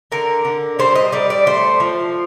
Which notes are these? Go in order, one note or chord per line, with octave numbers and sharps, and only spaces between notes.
D3 A#4
D3
G3 C5
D#5
G3 D5
D5
A3 C5
F3